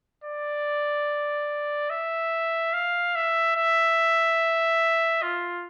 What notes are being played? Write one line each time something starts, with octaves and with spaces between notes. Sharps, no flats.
D5
E5
F5
E5
E5
F4